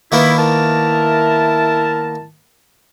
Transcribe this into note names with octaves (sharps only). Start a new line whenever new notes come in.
D#3 A#3 B3 E4
E4 A#4 A5